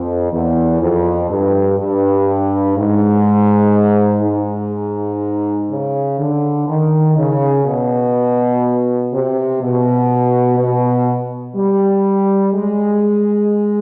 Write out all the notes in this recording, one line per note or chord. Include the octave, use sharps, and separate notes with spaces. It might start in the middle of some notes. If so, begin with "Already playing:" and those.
Already playing: F2
E2
F2
G2
G2
G#2
G#2
C#3
D3
D#3
C#3
B2
C3
B2
B2
G3
G#3